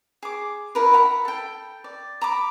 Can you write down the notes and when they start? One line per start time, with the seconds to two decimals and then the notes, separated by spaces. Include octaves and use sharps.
0.23 G#4 D6
0.75 E4 A#4 B4
0.94 F#5 A#5 B5
1.25 A4 G5
1.84 D5
2.21 A#5 B5 D6